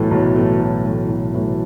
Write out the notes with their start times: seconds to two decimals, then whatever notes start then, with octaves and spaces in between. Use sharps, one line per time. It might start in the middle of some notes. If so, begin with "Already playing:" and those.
Already playing: B1 A2 E3 A3
0.11 B1
0.36 A2 E3 A3
0.60 B1
0.85 A2 E3 A3
1.09 B1
1.34 A2 E3 A3